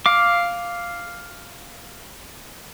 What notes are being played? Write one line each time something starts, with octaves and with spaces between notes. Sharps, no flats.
F5 D6